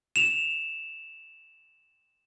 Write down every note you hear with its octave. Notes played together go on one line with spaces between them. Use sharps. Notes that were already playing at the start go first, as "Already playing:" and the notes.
E7 F7